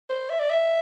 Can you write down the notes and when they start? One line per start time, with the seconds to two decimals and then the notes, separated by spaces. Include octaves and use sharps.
0.09 C5
0.29 E5
0.39 D5
0.50 E5